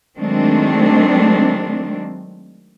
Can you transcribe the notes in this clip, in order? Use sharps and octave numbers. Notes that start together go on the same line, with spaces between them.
D#3 F#3 G#3 A3 C4 D4